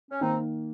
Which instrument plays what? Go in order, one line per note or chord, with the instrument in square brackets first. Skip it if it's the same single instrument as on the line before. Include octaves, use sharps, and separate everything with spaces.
[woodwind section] C#4
[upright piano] D#3 A#3 [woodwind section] C4 D#4